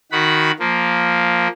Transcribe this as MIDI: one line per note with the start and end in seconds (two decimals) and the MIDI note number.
0.12 0.51 51
0.12 0.51 66
0.12 0.51 78
0.12 0.51 83
0.59 1.48 53
0.59 1.48 58